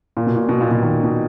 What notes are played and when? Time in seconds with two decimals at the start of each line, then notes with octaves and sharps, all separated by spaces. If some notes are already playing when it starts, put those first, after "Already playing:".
0.17 A#2
0.27 B2
0.36 A#2
0.49 B2
0.61 A#2
0.71 B2
0.82 D#3
1.04 B2